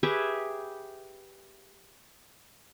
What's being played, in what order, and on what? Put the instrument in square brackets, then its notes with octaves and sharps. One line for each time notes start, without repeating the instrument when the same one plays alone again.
[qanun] G4 G#4 B4 E5